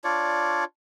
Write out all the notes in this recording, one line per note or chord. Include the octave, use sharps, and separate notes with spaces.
D4 F4 C#5 D5